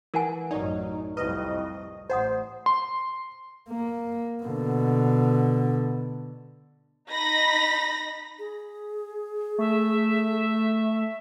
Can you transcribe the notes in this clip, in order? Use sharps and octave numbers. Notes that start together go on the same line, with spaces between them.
E3 A#4 F#5 G#5
A1 F#2 D#4 D5
C2 F2 B4 D#5
A1 C5 D#5 F#5 D#6
C6
A#3
B2 D3
D#4 B5 A#6
G#4
A3 E5